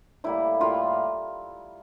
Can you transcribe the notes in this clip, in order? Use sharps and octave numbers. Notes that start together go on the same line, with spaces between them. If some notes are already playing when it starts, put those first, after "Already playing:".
A2 G3 A#3 E4
A2 G3 A#3 F4